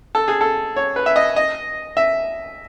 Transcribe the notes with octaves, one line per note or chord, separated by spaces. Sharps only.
A4
G#4
A4
C#5
B4
E5
D#5
D#5
E5